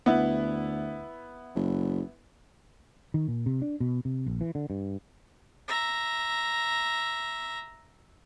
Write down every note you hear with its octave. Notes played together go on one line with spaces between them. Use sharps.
D2 B3 E4
F#1
D#3
A#2
C3
D4
B2
C3
A#1
E3
D3
G2
E5 A#5